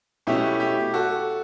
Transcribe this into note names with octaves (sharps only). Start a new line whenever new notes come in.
B2 A3 C#4 E4 G4
G4
F#4 A4